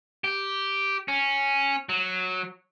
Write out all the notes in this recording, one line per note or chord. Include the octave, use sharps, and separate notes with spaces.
G4
C#4
F#3